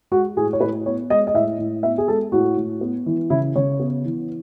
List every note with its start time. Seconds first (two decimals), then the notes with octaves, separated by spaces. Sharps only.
0.11 G#3 F#4
0.37 A2 G#4
0.53 C#5
0.61 A2 B4
0.86 B3 C#5
1.10 G#3 D#5
1.27 D#5
1.34 A2 E5
1.58 A2
1.83 B3 E5
1.98 G#4
2.08 G#3 A4
2.32 A2 F#4
2.57 A2
2.81 B3
3.06 E3
3.30 C#3 E4
3.56 C#3 C#5
3.80 B3
4.05 E3